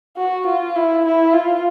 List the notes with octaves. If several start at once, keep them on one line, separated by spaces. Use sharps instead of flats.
F#4
F4
E4
E4
F4